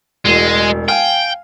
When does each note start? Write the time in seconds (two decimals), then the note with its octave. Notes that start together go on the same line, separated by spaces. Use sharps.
0.25 E1 A1 G#3
0.88 F5 G5 G#5